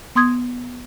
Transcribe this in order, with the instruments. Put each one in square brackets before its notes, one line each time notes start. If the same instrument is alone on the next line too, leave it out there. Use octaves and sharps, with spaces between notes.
[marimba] B3 C6 D#6 G#6